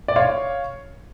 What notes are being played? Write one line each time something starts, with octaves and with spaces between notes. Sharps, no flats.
D5
C#5 F5